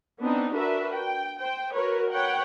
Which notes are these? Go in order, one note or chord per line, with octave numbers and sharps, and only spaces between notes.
B3 C4 D4 D#4
D4 F#4 A#4 B4 E5
G5
C5 G5
F#4 A#4 B4 C#5
B4 C#5 F#5 G5